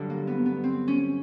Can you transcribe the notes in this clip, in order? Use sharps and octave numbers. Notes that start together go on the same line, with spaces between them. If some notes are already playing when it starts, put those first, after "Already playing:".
Already playing: G2 D3 F#3
A#3
B3
B3
C4
C#4